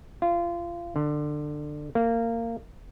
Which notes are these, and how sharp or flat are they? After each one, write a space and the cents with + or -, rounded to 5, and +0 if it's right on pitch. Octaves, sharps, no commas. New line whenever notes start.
F4 -25
D3 +20
A#3 -20